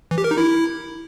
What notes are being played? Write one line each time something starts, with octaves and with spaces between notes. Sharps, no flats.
E3
G4
A#4
D#4
E4